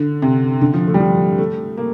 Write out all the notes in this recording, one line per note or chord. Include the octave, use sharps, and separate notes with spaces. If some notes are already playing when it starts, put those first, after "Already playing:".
Already playing: D3
C3
D3
F3
A3
G3
F3
A3
A#3